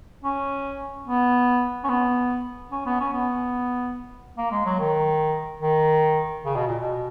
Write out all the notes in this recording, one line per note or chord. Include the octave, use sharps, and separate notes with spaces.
C#4
B3
C#4
B3
C#4
B3
C#4
B3
A#3
G#3
F#3
D#3
D#3
C#3
B2
A#2
B2